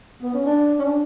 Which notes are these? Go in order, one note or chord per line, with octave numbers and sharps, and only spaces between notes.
B3
C#4
D4
C#4
D4